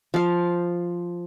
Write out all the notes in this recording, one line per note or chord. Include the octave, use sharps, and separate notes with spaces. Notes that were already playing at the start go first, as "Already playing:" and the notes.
F3 F5